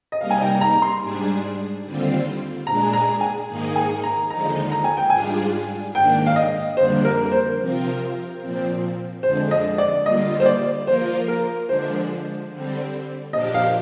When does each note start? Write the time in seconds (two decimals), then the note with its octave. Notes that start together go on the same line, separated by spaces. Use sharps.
0.12 D#5
0.20 C3 G3 A#3 D#4 A#4 F5
0.30 G#5
0.41 G5
0.61 A#5
0.82 C6
1.02 G#2 G3 D4 G#4
1.84 D#2 D3 G3 C4 F4
2.66 A#2 G#3 D4 G#4 A#5
2.93 A#5
3.21 G#5
3.48 G#2 D#3 A#3 D#4 G#4
3.76 G#5
4.04 A#5
4.30 D#2 D3 F3 G#3 D#4 A#5
4.72 A#5
4.84 G#5
4.97 G5
5.10 G#2 G3 D4 F4 G#4 G#5
5.94 G#2 D#3 A#3 D4 G5
6.26 F5
6.36 D#5
6.77 F2 D3 G3 A#3 D4 C5
7.05 A#4
7.26 A#4
7.32 C5
7.59 C3 F3 C4 F4 A#4
8.42 A#2 F3 C4
9.23 F2 D3 G#3 D4 C5
9.51 D#5
9.78 D5
10.05 D3 G3 A#3 F4 D#5
10.40 C5
10.46 D5
10.87 F3 A#3 F4 A#4 C5
11.28 A#4
11.69 D3 F3 G#3 D4 C5
12.51 D3 G3 C4
13.33 A#2 F3 A#3 D4 G4 D#5
13.54 F5